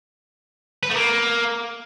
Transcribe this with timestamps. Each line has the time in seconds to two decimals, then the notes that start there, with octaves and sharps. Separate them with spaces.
0.83 B4
0.90 A3
0.96 A#3